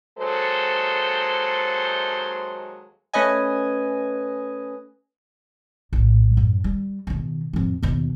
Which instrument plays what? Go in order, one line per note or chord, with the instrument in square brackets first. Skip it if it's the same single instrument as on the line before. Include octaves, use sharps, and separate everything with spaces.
[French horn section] D#2 F#3 G#3 A4 C5
[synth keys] A3 C#4 B4 D#5 G#5
[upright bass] A#1 A2
F#2
G3
B2 D#3
F2 A#3
D#2 B2